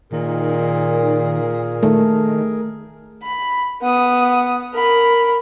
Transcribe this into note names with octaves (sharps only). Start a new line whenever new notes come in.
A#2 D#3 G#4 A#4
D#3 A3
B5
B3 D#6
A#4 B5